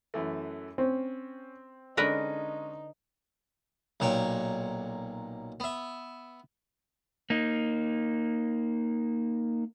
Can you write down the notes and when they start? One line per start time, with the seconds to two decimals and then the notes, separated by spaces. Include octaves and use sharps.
0.14 F#2 E3 A3
0.78 C4 C#4
1.97 D3 G#3 C#4 D#4 A#4 B4
4.00 B1 A#2 C#5 G5
5.60 B3 E5
7.30 A#3 D#4